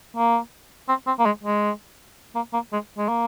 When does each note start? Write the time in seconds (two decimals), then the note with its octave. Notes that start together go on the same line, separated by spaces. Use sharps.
0.16 A#3
0.88 C4
1.07 C4
1.19 A#3
1.25 G#3
1.43 G#3
2.35 A#3
2.53 A#3
2.72 G#3
2.98 G#3
3.08 A#3